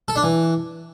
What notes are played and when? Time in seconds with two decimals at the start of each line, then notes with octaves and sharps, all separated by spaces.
0.08 A4
0.16 D4
0.23 E3